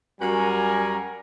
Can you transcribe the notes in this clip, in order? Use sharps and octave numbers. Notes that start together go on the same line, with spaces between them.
F#2 G3 F#4 A#4 G#5